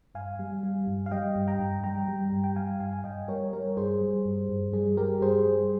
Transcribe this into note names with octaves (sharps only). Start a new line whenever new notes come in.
G2 F5 G#5
G3
G3
G2
F5
G3 D#5 G5
G2
G5 A#5
G2
G3 G5 A#5
G3
G2
G5
G3 F5 G#5
G2 F5 G#5
G#5
G2 D#5 G5
G3 A#4 C#5
G3 A#4 C#5
G2 G#4 C5
G3
G2
G2
G3 G#4
G3 G4 A#4
G2 G#4 C5
G3